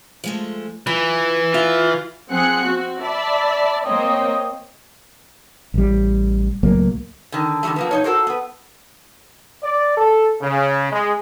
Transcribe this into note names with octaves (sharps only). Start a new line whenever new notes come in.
F3 G#3 A3
E3 F4
F4 E5
F3 C4 G#4 F#5 F#6 C#7
C4 F#4
D5 E5 A5 B5
A#3 C4 C5 C#5 D#5 G5
A1 G3
C#2 A2 F#3 A#3
D3 D#3
D3 D#3 F3 G3 A3
F3 A#3 B3
B2 D#4 C#5
F#4 A4 A#4 C5
B3 B4
D5
A4
C#3
G#3